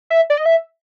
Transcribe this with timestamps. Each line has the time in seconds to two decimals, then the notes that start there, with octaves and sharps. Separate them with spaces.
0.10 E5
0.30 D5
0.38 D#5
0.46 E5